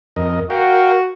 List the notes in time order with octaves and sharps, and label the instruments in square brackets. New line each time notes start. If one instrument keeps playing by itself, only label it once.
[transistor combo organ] F2 A#4 D#5
[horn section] F#4 [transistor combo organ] A#4 F5 G5